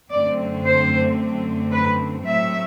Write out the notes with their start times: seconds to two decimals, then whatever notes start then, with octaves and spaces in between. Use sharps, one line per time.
0.10 F#2 D3 A3 C4 D5
0.64 C5
1.71 B4
2.24 A2 F#3 A3 C4 E5